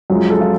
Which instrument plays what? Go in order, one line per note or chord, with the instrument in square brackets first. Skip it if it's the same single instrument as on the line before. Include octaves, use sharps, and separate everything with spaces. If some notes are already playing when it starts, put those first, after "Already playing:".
[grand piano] F#2 F3 G#3
A4
F4